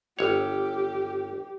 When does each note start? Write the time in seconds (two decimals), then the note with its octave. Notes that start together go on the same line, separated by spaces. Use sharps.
0.19 G1 G4 C#5